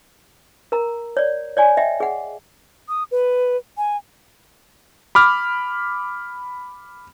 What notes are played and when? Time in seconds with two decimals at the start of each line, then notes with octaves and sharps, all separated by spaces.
0.72 A#4 A#5
1.17 C#5 D5
1.57 C#5 D5 G#5
1.77 D#5 E5 G5
2.00 G#4 F#5
2.89 D#6
3.11 B4
3.78 G#5
5.15 B5 D6 F6